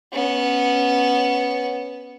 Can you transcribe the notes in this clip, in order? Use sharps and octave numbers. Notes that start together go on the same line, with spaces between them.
B3 C#4